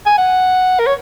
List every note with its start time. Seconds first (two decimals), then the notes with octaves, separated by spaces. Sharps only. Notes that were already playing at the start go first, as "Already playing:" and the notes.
0.06 G#5
0.18 F#5
0.79 A#4
0.87 C#5